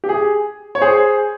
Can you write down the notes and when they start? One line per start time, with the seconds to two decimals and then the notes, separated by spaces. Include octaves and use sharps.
0.04 G4
0.09 G#4
0.75 C#5
0.81 G#4 C5